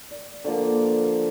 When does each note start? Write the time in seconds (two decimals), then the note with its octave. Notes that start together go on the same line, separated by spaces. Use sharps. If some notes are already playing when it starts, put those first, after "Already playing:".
0.11 D5
0.45 D3 F3 A#3